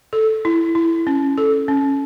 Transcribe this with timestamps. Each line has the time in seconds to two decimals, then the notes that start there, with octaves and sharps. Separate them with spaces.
0.13 A4
0.45 E4
0.75 E4
1.07 C#4
1.38 A4
1.68 C#4